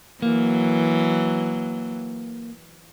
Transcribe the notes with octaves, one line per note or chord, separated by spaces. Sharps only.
E3 F#3 A#3